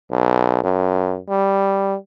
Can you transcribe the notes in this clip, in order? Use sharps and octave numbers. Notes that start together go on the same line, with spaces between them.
B1
F#2
G3